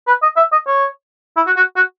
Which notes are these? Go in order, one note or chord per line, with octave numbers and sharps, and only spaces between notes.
B4
D#5
E5
D#5
C#5
E4
F#4
F#4
F#4